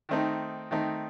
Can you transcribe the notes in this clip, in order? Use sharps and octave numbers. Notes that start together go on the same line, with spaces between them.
D#3 A3 C4 D#4
D#3 A3 C4 D#4